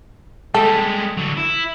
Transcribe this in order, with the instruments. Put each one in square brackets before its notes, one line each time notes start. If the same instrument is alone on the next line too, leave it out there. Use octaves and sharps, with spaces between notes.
[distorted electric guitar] G3 G#3 [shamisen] A4
[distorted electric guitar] D3 F#3
E4